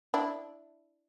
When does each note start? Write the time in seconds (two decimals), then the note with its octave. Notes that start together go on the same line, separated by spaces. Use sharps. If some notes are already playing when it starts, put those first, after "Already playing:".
0.14 D4 E4